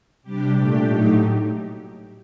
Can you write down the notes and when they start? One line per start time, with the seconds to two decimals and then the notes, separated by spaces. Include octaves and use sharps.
0.23 C3 G3 D4 G4
0.54 A#2 A3 D4 G4
0.86 A2 F#3 A3 D#4